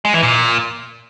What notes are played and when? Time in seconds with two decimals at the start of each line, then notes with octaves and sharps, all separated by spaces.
0.05 G#3
0.14 E3
0.23 A#2